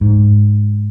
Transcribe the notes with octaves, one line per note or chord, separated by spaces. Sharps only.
G#2